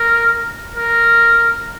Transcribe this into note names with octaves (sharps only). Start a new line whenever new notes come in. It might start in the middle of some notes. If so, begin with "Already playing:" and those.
Already playing: A#4
A#4